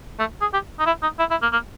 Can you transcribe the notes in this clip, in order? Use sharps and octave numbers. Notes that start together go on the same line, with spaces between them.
A3
G#4
G4
D#4
E4
D#4
E4
E4
A#3
A#3